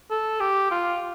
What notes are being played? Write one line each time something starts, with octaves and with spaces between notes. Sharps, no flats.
A4
G4
F4